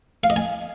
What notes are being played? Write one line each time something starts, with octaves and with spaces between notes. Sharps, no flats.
F5
D#5
G#5